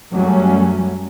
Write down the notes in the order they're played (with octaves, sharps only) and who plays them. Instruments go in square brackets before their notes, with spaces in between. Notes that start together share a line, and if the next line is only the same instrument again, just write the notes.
[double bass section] F#2 F#3 G3 A3 C#4